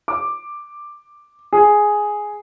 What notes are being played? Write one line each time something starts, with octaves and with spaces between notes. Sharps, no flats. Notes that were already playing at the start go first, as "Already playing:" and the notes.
D6
G#4